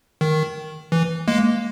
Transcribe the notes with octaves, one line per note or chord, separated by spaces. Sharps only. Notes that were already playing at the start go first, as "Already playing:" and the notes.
D#3
E3
G#3 A#3